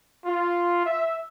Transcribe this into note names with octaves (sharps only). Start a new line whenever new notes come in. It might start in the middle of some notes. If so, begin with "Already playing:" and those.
F4
E5